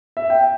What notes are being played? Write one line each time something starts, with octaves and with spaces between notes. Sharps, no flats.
E5
G5